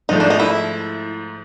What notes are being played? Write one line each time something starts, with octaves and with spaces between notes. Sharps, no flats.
G#2 F3 A3 D#4
D4
D#4
E4